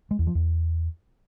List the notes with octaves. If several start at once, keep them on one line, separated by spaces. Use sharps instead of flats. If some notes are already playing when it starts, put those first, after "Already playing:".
G#3
E2
F3
E2